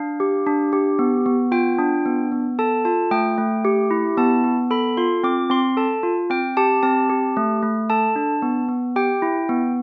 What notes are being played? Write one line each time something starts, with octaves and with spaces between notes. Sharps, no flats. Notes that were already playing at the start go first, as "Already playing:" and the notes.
Already playing: D4 F5
G4
D4
G4
B3
B3
F4 G5
D4
B3
B3
A4 A5
F4 A5
A3 G5
A3
G4
E4
B3 A5
B3
A4 B5
F4 C6
C4 D6
C4 C6
A4 A5
F4
C4 G5
G4 A5
C4 A5
G4
A3
A3
A4 A5
D4
B3
B3
G4 G5
E4
B3